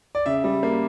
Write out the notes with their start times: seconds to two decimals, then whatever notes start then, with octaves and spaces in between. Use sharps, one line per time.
0.15 D5
0.26 C#3 E5
0.44 G3
0.63 A#3